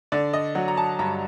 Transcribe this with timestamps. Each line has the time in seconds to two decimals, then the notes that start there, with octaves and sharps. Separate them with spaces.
0.12 D3 D5
0.33 D#5
0.55 F#3 F#5
0.68 A#5
0.77 A5
0.99 G2 A#5